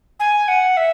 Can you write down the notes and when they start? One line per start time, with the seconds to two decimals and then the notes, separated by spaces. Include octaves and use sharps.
0.20 G#5
0.48 F#5
0.77 E5